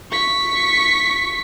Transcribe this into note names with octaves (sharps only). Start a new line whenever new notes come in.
C#6 B6